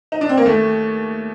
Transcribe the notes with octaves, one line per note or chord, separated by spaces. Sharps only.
D#4
D4
C4
A#3
D#2 A3